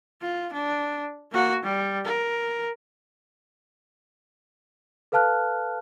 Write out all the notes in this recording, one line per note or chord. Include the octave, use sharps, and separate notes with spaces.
F4
D4
A#3 F#4
G3
A#4
A4 B4 F5 A5 F6 F#6